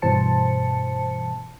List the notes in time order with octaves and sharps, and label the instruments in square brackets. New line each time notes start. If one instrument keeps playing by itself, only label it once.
[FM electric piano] G2 B2 E3 C5 A5 C#7